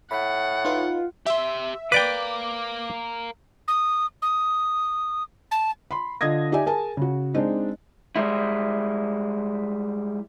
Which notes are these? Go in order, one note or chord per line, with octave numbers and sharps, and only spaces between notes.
A2 F#5 B5
D#4 F4 B4
G4 E5 C6
A#4 B4 D5 F5 G5 D6
D#6
D#6
A5
B5 C6
D3 F4 D#5 D#6 G#6 A#6
D#4 G4 D5 E5 G#5
G#4 A#4 G#5 A5
C#3 F#4
G#3 C4 D4 D#4
G3 G#3 E4